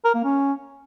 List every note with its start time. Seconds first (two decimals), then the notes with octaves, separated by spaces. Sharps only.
0.05 A#4
0.14 A#3
0.24 C#4